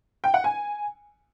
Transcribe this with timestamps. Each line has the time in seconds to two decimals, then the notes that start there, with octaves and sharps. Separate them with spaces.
0.24 G5
0.34 F#5
0.44 G#5